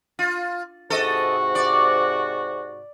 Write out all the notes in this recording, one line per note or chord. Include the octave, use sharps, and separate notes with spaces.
F4
G#2 C3 F#4 A4 D#5
D5